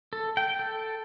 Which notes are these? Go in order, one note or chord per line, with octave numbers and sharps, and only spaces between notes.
A4
G5
A4